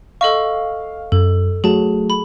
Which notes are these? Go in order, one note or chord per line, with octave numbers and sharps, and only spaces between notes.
A4 D#5 F5 C#6
F#2 A4
F#3 A3 F#4 G#4 A5
B5